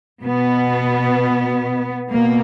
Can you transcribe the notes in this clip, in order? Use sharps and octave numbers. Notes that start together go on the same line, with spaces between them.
B2 B3
B2 A#3